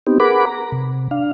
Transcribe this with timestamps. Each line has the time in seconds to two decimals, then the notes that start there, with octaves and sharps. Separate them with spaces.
0.07 B3 C4 D#4 G4
0.20 G#4 A#4 B4 F#5 B5 D6
0.46 A#5
0.72 C3
1.11 D4 F5